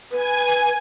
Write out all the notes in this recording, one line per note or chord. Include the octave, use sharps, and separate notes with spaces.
B4 G#5